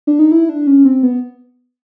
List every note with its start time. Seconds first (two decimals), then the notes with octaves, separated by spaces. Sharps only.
0.07 D4
0.19 D#4
0.32 E4
0.49 D4
0.67 C#4
0.85 C4
1.03 B3